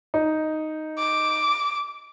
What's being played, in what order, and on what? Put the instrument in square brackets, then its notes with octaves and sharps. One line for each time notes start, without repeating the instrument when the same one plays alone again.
[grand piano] D#4
[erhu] D6